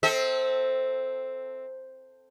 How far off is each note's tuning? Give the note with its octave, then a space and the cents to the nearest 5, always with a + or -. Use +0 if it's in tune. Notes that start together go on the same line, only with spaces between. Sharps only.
C4 +0 A4 +0 E5 -45